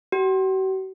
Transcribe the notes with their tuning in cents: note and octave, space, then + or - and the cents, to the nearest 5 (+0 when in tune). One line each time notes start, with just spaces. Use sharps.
F#4 +45